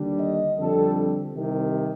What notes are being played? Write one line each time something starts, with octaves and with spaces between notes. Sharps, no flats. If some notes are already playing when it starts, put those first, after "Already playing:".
Already playing: D#2 D3 G3 D4
D#5
F2 D3 G3 C4 A4
C2 C3 D#3